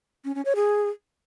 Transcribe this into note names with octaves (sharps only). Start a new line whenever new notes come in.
C#4
C#4
C#5
G#4